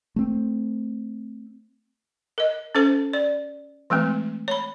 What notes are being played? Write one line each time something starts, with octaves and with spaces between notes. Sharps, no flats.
A3 C4
A#4 D#5
C#4 A4 C5 A5
D5
E3 G#3 A3 C4
C#5 B5